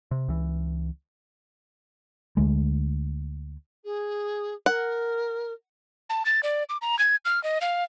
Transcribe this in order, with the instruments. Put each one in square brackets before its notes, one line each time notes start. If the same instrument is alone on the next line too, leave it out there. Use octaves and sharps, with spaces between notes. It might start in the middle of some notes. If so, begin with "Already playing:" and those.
[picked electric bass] C3
C#2 E3
[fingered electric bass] D2 G#3
[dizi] G#4
[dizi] A#4 [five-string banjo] F#5
[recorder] A5
A6
D5
D6
A#5
G#6
F6
D#5
F5